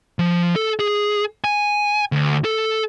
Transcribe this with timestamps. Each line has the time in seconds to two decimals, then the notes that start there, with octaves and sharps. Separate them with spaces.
0.19 F3
0.56 A4
0.79 G#4
1.44 G#5
2.12 D2
2.44 A4